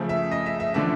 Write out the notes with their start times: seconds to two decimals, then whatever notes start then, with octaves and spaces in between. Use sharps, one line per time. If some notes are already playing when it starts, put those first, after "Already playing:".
Already playing: C#3 F3 A3
0.09 E5
0.31 D#5
0.46 E5
0.60 E5
0.74 D3 F3 A3 D4 E5